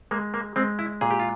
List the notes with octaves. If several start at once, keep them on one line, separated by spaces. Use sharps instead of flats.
G#3 A#3
A#3
G#3 C4
E4
A#2 G#4
G4
F4